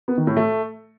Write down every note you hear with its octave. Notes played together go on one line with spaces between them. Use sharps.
B3
D#3
A2
A3